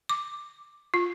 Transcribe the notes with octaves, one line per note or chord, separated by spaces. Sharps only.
D6
F4